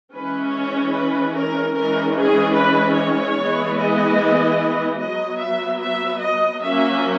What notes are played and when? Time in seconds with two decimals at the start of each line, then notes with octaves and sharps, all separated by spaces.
0.14 E3 G#3 C#4 B4
0.53 C#5
0.94 B4
1.36 A#4
1.76 E3 G#3 C#4 A#4
2.17 G#4
2.57 B4
2.97 C#5
3.39 E3 G#3 B3
3.79 D#5
5.00 F#3 B3 D#5
5.42 E5
5.82 E5
6.22 D#5
6.63 F#3 A#3 C#4 E5